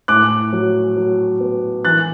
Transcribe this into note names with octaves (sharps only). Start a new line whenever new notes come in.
A2 D6 F#6
F#3
F#3
B3
E3 F#6 A6